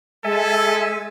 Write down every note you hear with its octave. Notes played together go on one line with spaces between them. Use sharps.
G#3 A4 E5 G#5